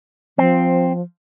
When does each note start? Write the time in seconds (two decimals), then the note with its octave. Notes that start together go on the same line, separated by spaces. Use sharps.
0.38 F3 C4